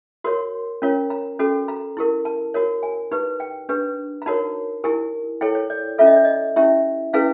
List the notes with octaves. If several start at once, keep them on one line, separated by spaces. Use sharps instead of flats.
F#4 A#4 C#5 C6
C#4 F4 A#4 C#5
A#5
C#4 F#4 A4
A#5
E4 G4 A#4
A5
F#4 A#4 C#5
G#5
D#4 G4 B4
G5
D4 G4 B4
A#5
D#4 F#4 A#4 C#5 A5
E4 G4 A#4 G#5
E4 A4 C#5 G5
C#5
D5
C#4 F4 A4 E5
D#5
D5
D#5
C#4 E4 G4 E5
C#4 E4 G#4 B4 F5